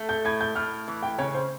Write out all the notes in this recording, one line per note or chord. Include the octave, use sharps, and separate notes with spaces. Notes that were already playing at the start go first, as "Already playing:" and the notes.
Already playing: A3
G6
A2 G#6
G6
A2 F6
E3
G5
C#3 C#5
C5